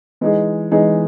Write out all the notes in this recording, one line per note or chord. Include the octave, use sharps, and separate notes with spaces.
E3 G#3 D#4 G#4
E3 G#3 D#4 G#4